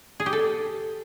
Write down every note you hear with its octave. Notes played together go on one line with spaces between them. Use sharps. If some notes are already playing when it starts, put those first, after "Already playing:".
G#4
G4
A4